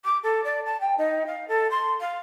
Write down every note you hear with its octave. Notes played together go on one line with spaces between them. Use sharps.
D6
A4
D5
A5
G5
D#4
F5
A4
C6
F5